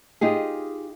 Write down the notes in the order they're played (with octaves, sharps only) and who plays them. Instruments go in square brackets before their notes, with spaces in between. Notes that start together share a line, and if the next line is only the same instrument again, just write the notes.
[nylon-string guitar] D#4 F4 G4 G#4